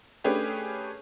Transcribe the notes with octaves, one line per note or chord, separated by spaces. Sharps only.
A3 C#4 D4 G4 G#4 B4